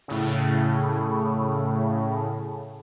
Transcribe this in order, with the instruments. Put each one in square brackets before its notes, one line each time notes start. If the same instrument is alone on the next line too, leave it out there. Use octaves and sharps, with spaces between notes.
[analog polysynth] A2 C#3